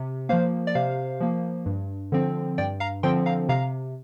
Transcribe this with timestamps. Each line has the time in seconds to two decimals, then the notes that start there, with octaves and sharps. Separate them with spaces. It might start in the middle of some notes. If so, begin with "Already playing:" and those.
Already playing: C3
0.29 F3 A#3 C5 F5
0.67 D5
0.75 C3 C5 F5
1.20 F3 A#3
1.66 G2
2.12 D3 F3 C4
2.58 G2 D5 G5
2.80 F5 A#5
3.03 D3 F3 C4 G5 C6
3.26 F5 A#5
3.49 C3 F5 A#5